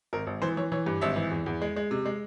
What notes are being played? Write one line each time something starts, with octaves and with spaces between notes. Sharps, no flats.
G#1 A#4
G#1
E3 C5
E3 C#5
E3 C#5
G2
G#1 E5
E3
E2
E2
G#3
G#3
C3
G#3